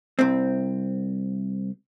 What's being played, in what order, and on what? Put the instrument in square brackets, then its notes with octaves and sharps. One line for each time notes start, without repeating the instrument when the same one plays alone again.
[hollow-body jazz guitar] C2 C4